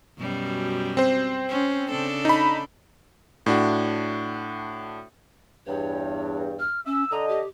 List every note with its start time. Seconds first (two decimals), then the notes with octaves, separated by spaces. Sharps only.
0.18 F#2 B2 G3
0.97 C4 C5
1.49 C#4
1.91 C#3 D4 A4
2.25 D#4 B5
3.46 A2 D4 F#4
5.67 E2 G2 C#5
6.59 F6
6.86 C#4 E6
7.11 D3 D#5 A#5
7.28 G4